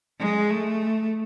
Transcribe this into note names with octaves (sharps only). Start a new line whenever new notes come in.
G#3
A3